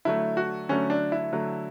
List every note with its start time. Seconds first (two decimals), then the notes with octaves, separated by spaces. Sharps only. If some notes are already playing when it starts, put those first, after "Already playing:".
0.05 D3 F#3 A3 E4
0.37 F#4
0.69 D3 F#3 A3 C#4
0.90 D4
1.12 E4
1.33 D3 F#3 A3